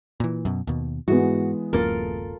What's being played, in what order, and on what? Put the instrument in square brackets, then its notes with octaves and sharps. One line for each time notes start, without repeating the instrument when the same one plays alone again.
[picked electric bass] A#2 E3
F#2 B2
D#2 B2
[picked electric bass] G#2 [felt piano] E3 G#3 B3 [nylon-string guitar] F#4
[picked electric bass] D1 F#2 A#3 [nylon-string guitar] F4 A4 A#4